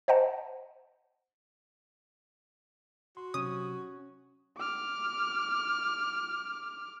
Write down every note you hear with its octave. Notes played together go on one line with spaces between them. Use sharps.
C5 D#5 F#5 A5
F#4 C6
C3 F#3 C#4 D#6
D6 F6